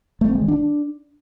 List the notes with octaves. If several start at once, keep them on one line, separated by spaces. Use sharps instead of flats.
A3
C4
G#3
D#3
D4